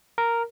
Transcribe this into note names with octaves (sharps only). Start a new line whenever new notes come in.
A#4